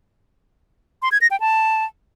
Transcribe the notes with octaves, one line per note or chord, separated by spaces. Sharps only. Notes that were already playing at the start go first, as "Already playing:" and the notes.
C6
G#6
A#6
G5
A5